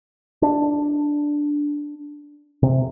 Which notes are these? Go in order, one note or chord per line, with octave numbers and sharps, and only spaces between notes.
D4
C3